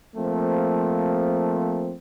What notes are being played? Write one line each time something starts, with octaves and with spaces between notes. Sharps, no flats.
F3 A3 A#3 C4